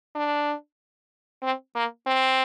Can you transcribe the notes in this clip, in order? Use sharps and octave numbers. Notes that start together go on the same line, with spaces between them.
D4
C4
A#3
C4